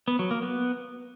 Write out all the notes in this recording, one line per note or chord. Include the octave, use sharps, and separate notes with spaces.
B3
F#3
A#3
B3